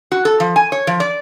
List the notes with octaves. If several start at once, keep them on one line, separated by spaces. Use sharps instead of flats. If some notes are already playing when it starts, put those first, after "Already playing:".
F#4
A4
F3
G#5
C#5
F3
D5